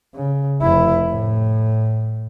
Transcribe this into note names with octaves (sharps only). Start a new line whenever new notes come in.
C#3
F1 E4
A2